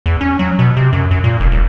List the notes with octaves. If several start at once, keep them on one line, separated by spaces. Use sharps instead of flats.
E2
C#4
F#3
B2
C3
F#2
F#2
A#2
F1
D#1